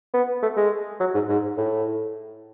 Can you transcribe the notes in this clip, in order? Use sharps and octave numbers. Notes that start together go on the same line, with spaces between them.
B3
A3
G#3
F#3
G#2
G#2
A2